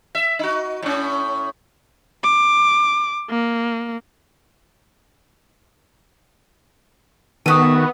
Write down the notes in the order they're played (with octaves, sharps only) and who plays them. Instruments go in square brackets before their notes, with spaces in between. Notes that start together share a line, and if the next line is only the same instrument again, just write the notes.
[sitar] E5
D#4 F#4
A2 C#4
[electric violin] D6
A#3
[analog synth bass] D#3 [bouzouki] A3 F#4 [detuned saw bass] B3 [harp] D#6 B6 D#7